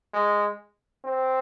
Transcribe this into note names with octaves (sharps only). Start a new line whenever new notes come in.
G#3
C4